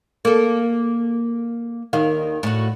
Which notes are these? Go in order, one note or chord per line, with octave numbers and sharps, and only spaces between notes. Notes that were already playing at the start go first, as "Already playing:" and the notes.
A#3 A4
D#2 D#3 F5
A2 F#4